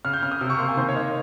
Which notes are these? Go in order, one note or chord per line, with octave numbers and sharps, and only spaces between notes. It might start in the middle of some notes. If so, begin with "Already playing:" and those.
C#3 F6
G6
C#3 F6
D#6
C3 F6
C#6
A#3 C6
G#5
D#3 C5
C#5
A#3 D#5